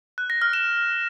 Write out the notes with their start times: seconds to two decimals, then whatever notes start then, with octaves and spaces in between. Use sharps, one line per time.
0.18 F#6
0.30 A#6
0.42 F6
0.53 E7